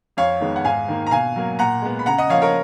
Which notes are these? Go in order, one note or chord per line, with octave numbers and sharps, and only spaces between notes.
F2 C#5 F5
D#3 G#3 B3
F#5
G#2 F5 G#5
D#3 A#3
A#5
B2 F5 G#5
F#3 A#3
A#2 F#5 A#5
G#3 B3
B5
C#3 F#5 A#5
D#5 F#5
F3 A#3 C#5 F5
A#4 C#5